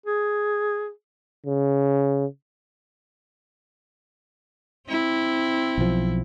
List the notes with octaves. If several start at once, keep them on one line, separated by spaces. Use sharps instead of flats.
G#4
C#3
C4 E4
B1 F3